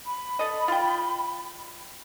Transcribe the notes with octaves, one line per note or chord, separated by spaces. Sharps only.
B5
A4 D#5
F4 G5